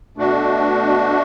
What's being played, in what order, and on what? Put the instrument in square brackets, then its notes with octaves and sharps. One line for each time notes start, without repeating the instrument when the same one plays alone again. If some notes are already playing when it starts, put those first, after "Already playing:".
[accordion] B2 A3 D4 F#4